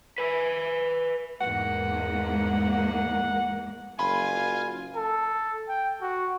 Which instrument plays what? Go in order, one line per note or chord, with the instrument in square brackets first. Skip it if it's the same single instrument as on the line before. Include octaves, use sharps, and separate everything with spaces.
[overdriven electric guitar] B4 G#5
[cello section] E2 G#2 A#3 [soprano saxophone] F#5
[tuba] F#1 [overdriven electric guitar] F4 [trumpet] G#5 [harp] B5
[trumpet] A4
G5
F#4